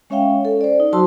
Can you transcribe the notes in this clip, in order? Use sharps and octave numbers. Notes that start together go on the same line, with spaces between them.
G#3 C#4 C#5 E5 F5 G5
A4
C5 D5
D#4
F#3 F#4 C5 A5 C6 E6